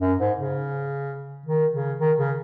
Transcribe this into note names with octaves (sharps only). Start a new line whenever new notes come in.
F#2
G#2
C#3
D#3
C#3
D#3
C#3